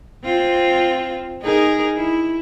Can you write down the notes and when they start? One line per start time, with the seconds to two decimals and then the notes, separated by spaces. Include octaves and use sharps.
0.24 C4 F4
1.43 D#4 G#4 A#4
1.97 E4